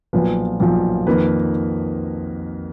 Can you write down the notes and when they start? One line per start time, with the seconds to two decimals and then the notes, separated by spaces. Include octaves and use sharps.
0.13 B1 A#2 F3 B4
0.60 B1 A#2 F3
1.07 F2 D#3 A#3 B4